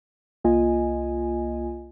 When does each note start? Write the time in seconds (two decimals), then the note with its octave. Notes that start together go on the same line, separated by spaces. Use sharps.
0.44 C2 A#3 F4 D#5 G#5